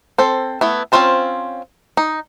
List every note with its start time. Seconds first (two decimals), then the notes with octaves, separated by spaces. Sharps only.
0.18 C4 A4 C5
0.61 A3 B3 E4
0.92 C4 C#4 F4 C5 A5
1.97 D#4